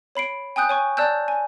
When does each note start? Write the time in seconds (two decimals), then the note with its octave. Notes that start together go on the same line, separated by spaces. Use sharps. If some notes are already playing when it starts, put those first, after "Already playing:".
0.15 C#5 B5 C7 D7
0.56 G5 G#5 D#6 F#6 G6
0.69 C#5 G#5 C#6
0.97 D5 A5 E6 F#6 G6
1.28 G#5